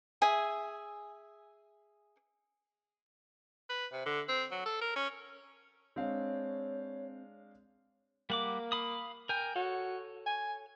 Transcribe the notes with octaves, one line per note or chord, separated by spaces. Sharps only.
G#4 E5 G#5
B4
C3
D3
C4
F#3
A4
A#4
C#4
G#3 C4 D4 C#5 F5
G3 A#3 F#5 D6
F5 B5 D#6
A#4 G5 G#5
F#4 A4 C#5
G#5